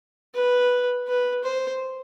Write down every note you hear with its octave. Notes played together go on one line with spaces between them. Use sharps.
B4
B4
C5